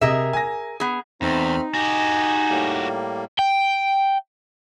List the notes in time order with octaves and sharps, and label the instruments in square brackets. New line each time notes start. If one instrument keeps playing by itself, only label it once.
[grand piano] C3 D#5 [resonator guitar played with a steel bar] G#4 A#4 E5
[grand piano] G#5 A#6
[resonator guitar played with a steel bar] B3 G#4
[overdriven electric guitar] E2 [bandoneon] A3 B5 F6 [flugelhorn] C4 [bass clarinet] D#4
[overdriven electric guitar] F#4 G4 [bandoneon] D#5 G6 [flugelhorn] G#5
[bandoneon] A2 G3 A#3
[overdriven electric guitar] G5